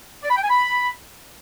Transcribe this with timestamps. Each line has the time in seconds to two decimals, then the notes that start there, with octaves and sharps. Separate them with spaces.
0.23 D5
0.30 B5
0.37 G5
0.43 G#5
0.50 B5